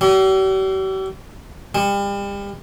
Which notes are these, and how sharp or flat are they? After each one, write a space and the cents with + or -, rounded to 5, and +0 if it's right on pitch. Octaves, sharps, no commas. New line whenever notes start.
G3 -45
G3 +35